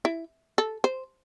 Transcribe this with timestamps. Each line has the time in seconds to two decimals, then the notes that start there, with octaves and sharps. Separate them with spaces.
0.05 E4
0.58 A4
0.84 C5